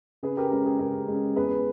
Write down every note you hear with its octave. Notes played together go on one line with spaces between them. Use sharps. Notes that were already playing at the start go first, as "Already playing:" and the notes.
C#3 G#4 B4
G4 A#4
G#3 C#4 G4
G#4
C#3 G4 A#4
G#3 C#4
E2 G#4 B4